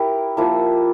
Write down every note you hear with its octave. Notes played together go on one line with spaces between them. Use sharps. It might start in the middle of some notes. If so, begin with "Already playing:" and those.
Already playing: E4 G4 A#4
F3 A#3 E4